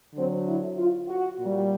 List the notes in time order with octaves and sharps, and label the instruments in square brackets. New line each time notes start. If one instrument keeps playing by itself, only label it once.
[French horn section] D3 F#3 C4
E4
F4
F#4
A#2 G3